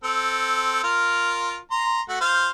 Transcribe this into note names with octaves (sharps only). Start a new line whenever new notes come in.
C4 A4
F4 A#4
A#5 C6
A3 F#4
F4 C5 F5